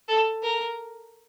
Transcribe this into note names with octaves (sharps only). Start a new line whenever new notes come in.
A4
A#4